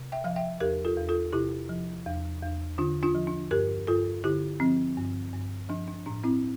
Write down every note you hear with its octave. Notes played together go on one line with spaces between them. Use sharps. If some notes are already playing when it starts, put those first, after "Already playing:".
Already playing: C3
E5 G5
F3 F5
E5 G5
E2 G4 A#4
F4 A4
E2
F4 A4
C3 E4 G4
F3
E2
E2
D3 D4 F4
D4 F4
F3
D4
G2 G4 A#4
G2 F4 A4
D3 E4 G4
F3 C4
G2
G2
F3 D4
D4
A2 D4
C4 E4